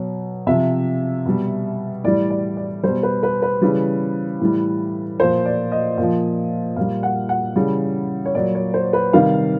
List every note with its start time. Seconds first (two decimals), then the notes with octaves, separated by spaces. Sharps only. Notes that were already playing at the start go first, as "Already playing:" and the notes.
Already playing: B2 F#3
0.47 C3 F3 E5
1.26 B2 G3
2.04 A2 E3 G3 D5
2.30 D5
2.57 D5
2.84 B2 G3 C5
3.03 B4
3.23 B4
3.42 B4
3.62 C#3 E3 G3
4.41 A2 E3 G3
5.20 A#2 F3 C5
5.46 D5
5.72 D#5
5.98 A#2 F3
6.76 A#2 G3 F5
7.03 F#5
7.29 F#5
7.56 C#3 E3 G3
8.26 C#5
8.35 A#2 F#3 D5
8.55 C#5
8.74 C5
8.93 B4
9.13 C3 D#3 G3 F5